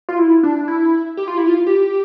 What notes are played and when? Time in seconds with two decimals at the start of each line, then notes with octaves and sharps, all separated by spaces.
0.09 F4
0.19 E4
0.43 D4
0.68 E4
1.17 G4
1.28 F4
1.38 E4
1.48 F4
1.67 G4